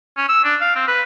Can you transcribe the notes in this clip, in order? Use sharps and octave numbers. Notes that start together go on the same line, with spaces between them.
C#4
E6
D4
F5
C4
B4